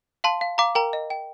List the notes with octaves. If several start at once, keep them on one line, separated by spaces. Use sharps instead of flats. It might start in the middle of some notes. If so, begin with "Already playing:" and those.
F5 A5 C6
F5
F5 A#5 D6
A#4 G5 A#5
D#5
G5